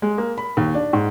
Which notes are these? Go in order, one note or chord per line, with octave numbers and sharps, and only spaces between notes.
G#3
A#3
B5
D#2
D4
G#2